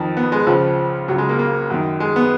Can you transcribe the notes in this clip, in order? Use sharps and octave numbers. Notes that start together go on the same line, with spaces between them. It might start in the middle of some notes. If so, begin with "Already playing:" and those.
Already playing: F2 D#3
B3
G#3
C#2 C#3 F3
C#2 C#3 F#3
G#3
A#3
A#3
F#2 D#3
G#3
B3